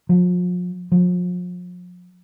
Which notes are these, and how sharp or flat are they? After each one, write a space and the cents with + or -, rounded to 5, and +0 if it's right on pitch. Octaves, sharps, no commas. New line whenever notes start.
F3 +40
F3 +40